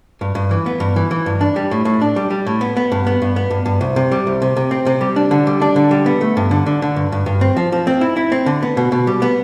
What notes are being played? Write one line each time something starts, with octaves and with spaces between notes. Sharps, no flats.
G2
G2
E3
B3
G2
E3
E3
G2
D4
G3
A2
A2
D4
G3
G3
A2
B3
B3
G2
B3
G2
B3
G2
G2
C2
C3
G3
C2
C3
C3
C4
C3
G3
D4
D3
G3
D4
D3
G3
B3
A3
G2
D3
D3
D3
G2
G2
G2
C4
F3
F3
C4
E4
E4
C4
D3
B3
B2
B2
G3
B3